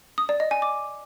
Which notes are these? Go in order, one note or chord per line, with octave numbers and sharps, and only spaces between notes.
D#6
D5
D#5
G#5
D6